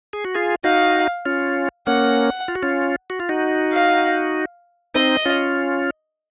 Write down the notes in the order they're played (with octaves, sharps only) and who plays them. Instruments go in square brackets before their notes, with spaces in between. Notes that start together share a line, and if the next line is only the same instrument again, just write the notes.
[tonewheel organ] G#4
F#4
F4 G#4
[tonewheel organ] D#4 F#4 [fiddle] F5
[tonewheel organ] C#4 F4
[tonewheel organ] A#3 C#4 [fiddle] F#5
[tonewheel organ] F4
F#4
C#4 F4
F#4
F4
D#4 F#4
[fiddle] F5
[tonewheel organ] C4 D#4 [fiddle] D#5
[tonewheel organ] C#4 F4